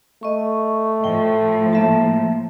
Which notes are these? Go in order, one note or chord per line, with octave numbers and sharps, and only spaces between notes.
A3 D#5 C#6
A2 F3 G5
A#3 E5 A5